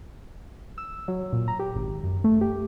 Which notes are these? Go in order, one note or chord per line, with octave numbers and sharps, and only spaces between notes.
E6
F#3
A#2
A#5
G4
G#1
F#2
A3
G4